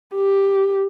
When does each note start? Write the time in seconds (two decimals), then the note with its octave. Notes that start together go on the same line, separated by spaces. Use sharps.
0.15 G4